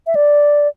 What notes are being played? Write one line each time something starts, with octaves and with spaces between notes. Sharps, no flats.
E5
D5